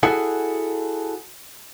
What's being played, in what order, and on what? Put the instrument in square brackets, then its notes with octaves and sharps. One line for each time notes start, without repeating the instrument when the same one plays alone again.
[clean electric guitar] E4 F#4 G#4 A4 F#5